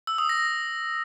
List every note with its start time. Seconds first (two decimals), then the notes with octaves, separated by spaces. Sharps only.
0.07 E6
0.18 D#6
0.29 A#6